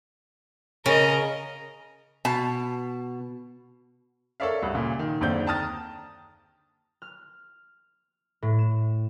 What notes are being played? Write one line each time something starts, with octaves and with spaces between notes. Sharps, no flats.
C#3 A#4 D#5
B2 A5
A4 A#4 C#5 D5 E5 F5
D2 G2
A#2 C#3
D#3
F#1 D#2 D3 C4 D5 G6
G5 A5 A#5 D#6 F6 A6
F6
A2
E7